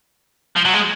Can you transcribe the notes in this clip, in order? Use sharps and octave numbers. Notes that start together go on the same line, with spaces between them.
F3
F#3
G#3